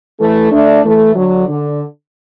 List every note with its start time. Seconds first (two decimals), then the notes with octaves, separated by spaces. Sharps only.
0.19 E3 A3
0.51 A3 D4
0.83 E3 A3
1.15 D3 F#3
1.48 D3